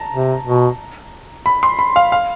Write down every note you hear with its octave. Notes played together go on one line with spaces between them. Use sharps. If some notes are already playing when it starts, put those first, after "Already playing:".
Already playing: A5 A#5
C3
B2
B5
C6
B5
F5
F5